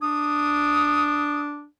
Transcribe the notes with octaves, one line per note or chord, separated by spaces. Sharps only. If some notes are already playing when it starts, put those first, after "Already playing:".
D4 D#6